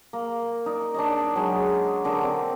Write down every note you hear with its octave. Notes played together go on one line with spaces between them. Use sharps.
A#3
D#4 D5
D4 C#5 D#5
F#3 G#3
D3 A#4 D6
C4 D5